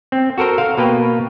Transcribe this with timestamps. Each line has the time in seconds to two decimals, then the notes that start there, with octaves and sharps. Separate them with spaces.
0.12 C4
0.38 F#4 A4 A#4 C5
0.58 F5
0.78 B2 A#3 B4 G5